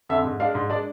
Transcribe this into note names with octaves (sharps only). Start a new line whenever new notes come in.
F2 D3 E5
G#2
G#3 D4 F5
G#2
G#3 D4 D5